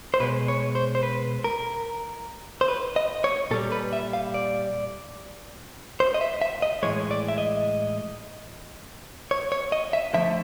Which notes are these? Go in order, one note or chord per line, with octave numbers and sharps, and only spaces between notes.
C5
B2 G#3 B4
C#5
C5
C5
B4
A#4
C5
B4
D#5
C#5
A#2 G3 A4
B4
E5
F5
D5
C5
D#5
E5
E5
D#5
A2 E3 G#3 C#5
D5
E5
D#5
C#5
C#5
D#5
E5
D3 F3 A3 E5